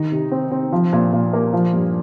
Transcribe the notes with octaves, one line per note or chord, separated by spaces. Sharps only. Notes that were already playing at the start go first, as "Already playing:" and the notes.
Already playing: D#3 D#4
C3
C4
C4
F3
A#2
A#2
A#3
F3
G2